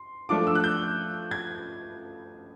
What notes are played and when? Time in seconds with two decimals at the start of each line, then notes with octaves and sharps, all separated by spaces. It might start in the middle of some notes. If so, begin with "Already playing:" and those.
Already playing: C6
0.29 F3 A3 D4 F4 D6
0.47 E6
0.55 F#6
0.64 G6
1.31 G#6